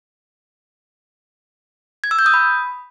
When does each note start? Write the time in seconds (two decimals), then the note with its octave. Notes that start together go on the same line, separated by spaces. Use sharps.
2.04 G#6
2.11 E6
2.19 G6
2.26 D#6
2.34 B5